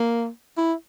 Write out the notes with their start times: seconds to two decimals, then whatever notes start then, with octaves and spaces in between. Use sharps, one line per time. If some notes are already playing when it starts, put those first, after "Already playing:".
Already playing: A#3
0.57 E4